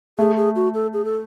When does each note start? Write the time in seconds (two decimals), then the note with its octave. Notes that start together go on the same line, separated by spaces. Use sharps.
0.19 A3 G#4
0.37 G#4
0.56 F#4
0.74 A4
0.93 G#4
1.05 A4